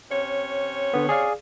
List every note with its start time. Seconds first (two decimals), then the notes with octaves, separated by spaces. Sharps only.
0.10 C3 C#4 C#5
0.94 D3 B3
1.09 G#4 D5 F5